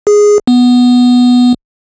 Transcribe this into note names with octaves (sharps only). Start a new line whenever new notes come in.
G#4
B3